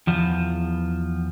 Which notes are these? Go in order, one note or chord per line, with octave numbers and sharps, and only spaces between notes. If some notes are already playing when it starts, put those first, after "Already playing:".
E2 F3